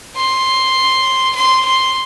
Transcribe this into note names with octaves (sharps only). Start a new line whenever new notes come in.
C6
C6
C6